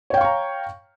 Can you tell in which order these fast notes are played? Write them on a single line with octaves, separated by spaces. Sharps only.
C#5 G5 F5 C#6 A#5